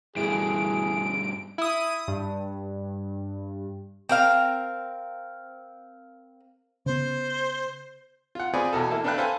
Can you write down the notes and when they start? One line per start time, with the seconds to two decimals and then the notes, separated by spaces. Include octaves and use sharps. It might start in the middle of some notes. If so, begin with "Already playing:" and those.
0.16 G2 B2 E3 G#4 D7
1.58 E4 D#6
2.08 G2
4.09 C4 A#4 F5
6.86 C#3 B3 C5
8.35 F4 F#5
8.54 C4 F4 G#4 B4 D5 G#5
8.73 E2 B2 A4
8.90 A#3 E4 A4
9.04 D4 A4 B4 F5 G5 F#6
9.18 A4 B4 C5 E5 F5 G#5